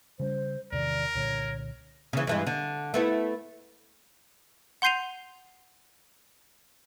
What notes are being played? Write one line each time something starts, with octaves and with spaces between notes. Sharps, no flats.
C#3 G3 C#4 C5
E2 C3 D#3 A#4 D5
C2 A#2 D3 C#5
C#3 E3
G2 E3 G#3
D3
A3 B3 E4
F#5 C6 G6 C7 D#7 F7